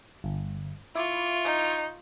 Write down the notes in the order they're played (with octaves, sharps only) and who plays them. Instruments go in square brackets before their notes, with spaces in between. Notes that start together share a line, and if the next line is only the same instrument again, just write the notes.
[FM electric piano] G1
[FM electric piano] E4 D6 [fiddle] F4 C#6
[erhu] D#4